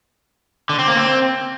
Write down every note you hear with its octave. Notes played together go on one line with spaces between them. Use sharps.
D3
C4
A#3
C4